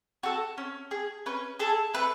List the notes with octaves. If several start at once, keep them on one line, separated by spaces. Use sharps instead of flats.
F#4 A4
C#4
G#4
C#4 B4
G#4 A4
A3 B4